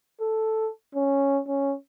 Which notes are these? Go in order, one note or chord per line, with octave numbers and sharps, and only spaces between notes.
A4
C#4
C#4